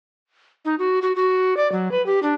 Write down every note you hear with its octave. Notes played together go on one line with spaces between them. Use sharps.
D#4
F#4
F#4
F#4
D5
F#3
B4
G4
D4